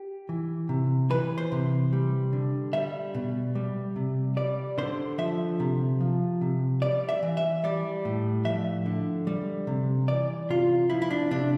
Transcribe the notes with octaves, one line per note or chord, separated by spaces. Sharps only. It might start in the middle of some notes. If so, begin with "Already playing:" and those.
Already playing: G4
E3
C3
E3 B4
C5
C3
G3
D3
G3 E5
B2
G3
C3
G3 D5
D3 C5
F3 E5
C3
F3
C3
G3 D5
E5
E3
E5
G3 D5
A2
F3 E5
D3
G3
C3
E3 D5
C3 F4
F3 E4
E4
D4
C3 D4